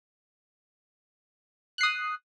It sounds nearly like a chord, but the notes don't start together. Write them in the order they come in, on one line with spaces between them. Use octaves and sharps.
F#6 C7 D#6